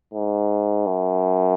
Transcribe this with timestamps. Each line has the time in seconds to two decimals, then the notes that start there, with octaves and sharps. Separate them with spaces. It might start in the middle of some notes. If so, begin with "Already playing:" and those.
0.14 G#2
0.87 F#2